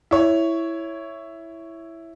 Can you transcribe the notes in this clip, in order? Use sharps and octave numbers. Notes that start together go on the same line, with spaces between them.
E4 C#5